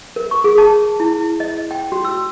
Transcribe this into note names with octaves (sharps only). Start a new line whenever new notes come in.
A#4
C#6
G#4
A5
E4
D#5
G5
F#4
E6